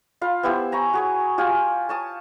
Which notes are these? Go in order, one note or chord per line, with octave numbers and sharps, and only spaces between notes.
F4 F5 B5
B3 E4 G4 C5
G#5 A#5 B5 C#6
F#4 G#4 C#5
F4 G4 F5 G#5
C#5 A5 D#6